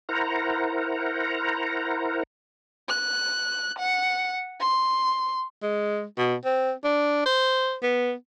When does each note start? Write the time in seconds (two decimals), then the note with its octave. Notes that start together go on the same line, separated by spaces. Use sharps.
0.09 E4 A#4 C5 F#5 A#5
2.89 F#6
3.79 F#5
4.60 C6
5.63 G#3
6.18 B2
6.45 C4
6.84 D4
7.26 C5
7.82 B3